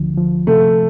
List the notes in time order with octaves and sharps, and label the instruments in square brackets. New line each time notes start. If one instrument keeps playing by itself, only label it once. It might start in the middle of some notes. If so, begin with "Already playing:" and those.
Already playing: [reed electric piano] D2 D3 F3
F3
[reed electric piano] C3 [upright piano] A3